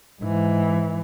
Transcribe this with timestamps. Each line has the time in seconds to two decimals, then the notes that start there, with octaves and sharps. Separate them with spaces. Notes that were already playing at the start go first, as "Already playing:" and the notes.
0.21 G#2 E3